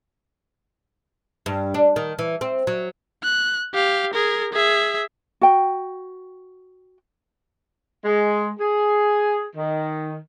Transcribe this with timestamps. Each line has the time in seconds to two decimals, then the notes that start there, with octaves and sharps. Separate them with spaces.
1.46 G2
1.74 D4
1.96 D#3
2.19 E3
2.41 C4
2.67 F#3
3.23 F#6
3.74 G4 F5
4.14 G#4 A#4
4.53 G#4 E5
5.42 F#4 G5
8.05 G#3
8.60 G#4
9.56 D#3